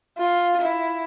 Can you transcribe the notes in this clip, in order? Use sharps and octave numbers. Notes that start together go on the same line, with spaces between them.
F4
E4